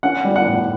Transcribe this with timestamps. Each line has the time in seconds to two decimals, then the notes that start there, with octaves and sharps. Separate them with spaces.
0.03 C#4 F#5
0.25 G3
0.36 F#5
0.47 A2